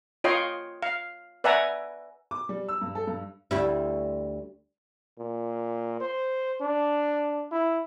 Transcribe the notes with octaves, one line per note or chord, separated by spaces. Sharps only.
F4 C#5 D#5 G5 C6
F5
B4 D5 E5 F#5 G#5 A#5
D6
G3
E6
G2
A4
G2
D2 G3 E4
A#2
C5
D4
E4